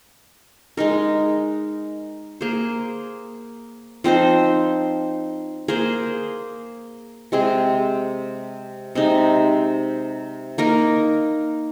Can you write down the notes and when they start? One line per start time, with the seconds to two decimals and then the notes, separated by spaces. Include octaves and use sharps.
0.77 G#3 D#4 A#4
2.41 A#3 G#4 C5
4.04 F3 C4 D#4 C5
5.68 A#3 G#4 C5
7.32 C3 G#3 C4 G#4
8.95 C3 G#3 D#4
10.58 A#3 D#4 A#4